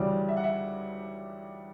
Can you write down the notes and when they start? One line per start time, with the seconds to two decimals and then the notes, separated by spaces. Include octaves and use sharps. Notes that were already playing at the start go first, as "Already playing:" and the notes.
Already playing: D2 C#3 E3 G3 D5
0.29 E5
0.37 F#5
0.44 E5